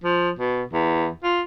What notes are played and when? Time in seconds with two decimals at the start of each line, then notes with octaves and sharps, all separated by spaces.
0.04 F3
0.39 B2
0.73 E2
1.24 F4